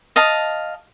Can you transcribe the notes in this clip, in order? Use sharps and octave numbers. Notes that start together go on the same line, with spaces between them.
D#5 F5 A5